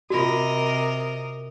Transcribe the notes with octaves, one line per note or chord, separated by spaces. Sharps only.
C3 F4 F#4 A#4 D#5